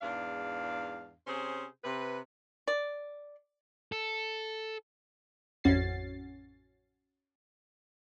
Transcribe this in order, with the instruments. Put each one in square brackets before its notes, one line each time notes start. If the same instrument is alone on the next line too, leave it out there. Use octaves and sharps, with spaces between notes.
[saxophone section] E2 G#2 D4 F5
C3 C#4 G#4 C5
C3 B4
[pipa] D5
[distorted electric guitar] A4
[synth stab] A1 F2 C#4 F#4 A6 C7